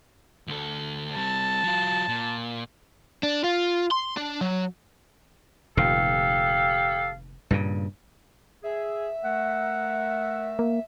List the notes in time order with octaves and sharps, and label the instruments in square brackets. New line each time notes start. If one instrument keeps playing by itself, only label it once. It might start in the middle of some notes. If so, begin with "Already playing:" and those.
[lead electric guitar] D2 A4
[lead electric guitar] G3 C4 [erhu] A5
[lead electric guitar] F#3 F4
A#2
[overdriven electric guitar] D4
F4
C6
D4
F#3
[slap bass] F1 A#2 D#3 [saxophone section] G4 A4 F5
[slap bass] G2 A#2 C#3
[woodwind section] G#4 [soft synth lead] E5
[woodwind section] A3 A#4 [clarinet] F#5
[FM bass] A#3